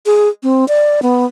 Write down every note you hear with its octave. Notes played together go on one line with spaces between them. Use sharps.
G#4
C4
D5
B3